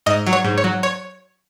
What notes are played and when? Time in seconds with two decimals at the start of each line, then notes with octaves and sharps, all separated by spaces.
0.06 G#2 D#5
0.27 F#3
0.33 C#5
0.45 G#2
0.58 C#5
0.64 F#3
0.83 C#5